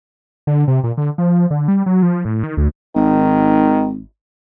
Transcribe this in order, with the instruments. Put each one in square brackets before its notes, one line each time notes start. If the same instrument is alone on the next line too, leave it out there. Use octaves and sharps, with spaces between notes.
[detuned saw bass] D3
C3
A#2
D3
F3
D3
G3
F#3
F3
A2
D#3
D2
[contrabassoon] G#1 [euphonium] D#3